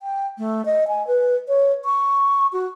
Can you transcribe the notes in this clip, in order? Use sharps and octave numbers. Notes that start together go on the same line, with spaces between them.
G5
A3
D#5
G#5
B4
C#5
C#6
F#4